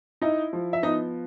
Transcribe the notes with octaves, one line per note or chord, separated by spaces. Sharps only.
D#4 E4 D#5
F3
E5
B3 D#4 D#5